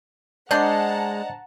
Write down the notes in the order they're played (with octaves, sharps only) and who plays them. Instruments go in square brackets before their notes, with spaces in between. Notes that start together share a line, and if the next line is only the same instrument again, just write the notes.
[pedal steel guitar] G#3 [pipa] D4 C5 [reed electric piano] D5 D#5 [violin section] F#5 A5 A#5